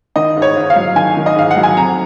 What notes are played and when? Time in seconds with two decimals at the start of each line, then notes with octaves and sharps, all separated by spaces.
0.16 D#3 D#5
0.37 G#2
0.42 C#5
0.57 G#2
0.70 F5
0.76 F#3
0.96 D#3 G#5
1.17 D#3
1.26 D#5
1.36 G#2 F5
1.51 F#5
1.57 F#3
1.63 G#5
1.76 F2 A#5